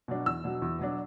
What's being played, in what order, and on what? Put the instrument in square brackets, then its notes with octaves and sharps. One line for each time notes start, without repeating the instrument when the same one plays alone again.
[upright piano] B2 F#3 D4
E2 E6
B2 F#3 D4
E2
B2 F#3 D4